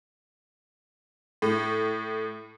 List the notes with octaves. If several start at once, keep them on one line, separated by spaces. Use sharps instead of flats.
A2